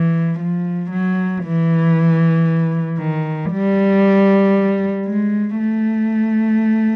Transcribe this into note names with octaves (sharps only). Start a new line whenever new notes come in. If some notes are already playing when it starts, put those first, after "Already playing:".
Already playing: E3
F3
F#3
E3
D#3
G3
G#3
A3